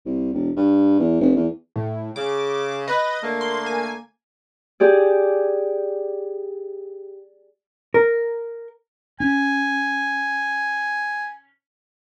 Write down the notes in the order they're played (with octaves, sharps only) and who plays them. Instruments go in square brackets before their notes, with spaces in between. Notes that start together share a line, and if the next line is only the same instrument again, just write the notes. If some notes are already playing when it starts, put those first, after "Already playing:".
[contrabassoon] C2
E1
G2
E2
F1
E2
[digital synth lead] A2
[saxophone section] C#3 [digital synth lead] D6
[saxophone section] B4 [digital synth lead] D#5
[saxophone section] D3 A3 A#3
[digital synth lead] C6
G#5
[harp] G4 G#4 D5
[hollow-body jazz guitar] A#4
[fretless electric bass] C#4 [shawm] G#5